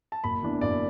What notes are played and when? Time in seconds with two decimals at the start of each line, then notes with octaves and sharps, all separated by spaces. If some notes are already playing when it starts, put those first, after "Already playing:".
0.12 A5
0.24 F#1 B5
0.42 E2 E3 D4
0.61 F#1 D5